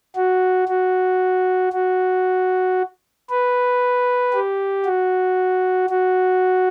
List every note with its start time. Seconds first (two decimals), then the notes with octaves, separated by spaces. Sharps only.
0.16 F#4
0.68 F#4
1.73 F#4
3.30 B4
4.33 G4
4.85 F#4
5.90 F#4